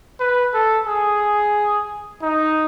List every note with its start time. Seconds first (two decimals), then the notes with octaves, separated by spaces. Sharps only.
0.20 B4
0.54 A4
0.87 G#4
2.23 D#4